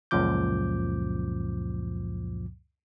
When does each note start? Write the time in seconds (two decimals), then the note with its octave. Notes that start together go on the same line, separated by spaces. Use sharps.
0.11 C#2 F#2 A#2 F3 D6 G6